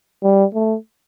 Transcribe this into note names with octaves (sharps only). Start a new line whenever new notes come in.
G3
A3